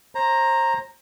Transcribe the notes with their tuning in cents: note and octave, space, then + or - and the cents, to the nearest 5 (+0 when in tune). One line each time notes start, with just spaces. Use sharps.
C5 +30 A#5 +0